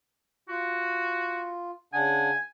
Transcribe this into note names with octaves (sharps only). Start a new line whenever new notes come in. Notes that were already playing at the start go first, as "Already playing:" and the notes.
F4 F#4
C#3 D4 F#5 G#5